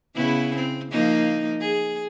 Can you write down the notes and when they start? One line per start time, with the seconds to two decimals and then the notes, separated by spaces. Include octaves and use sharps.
0.15 C#3 B3 E4
0.55 C4
0.92 F3 A#3 D#4
1.61 G#4